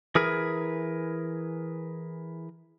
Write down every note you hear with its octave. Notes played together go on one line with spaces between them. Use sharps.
E3 G#4 A#4 B4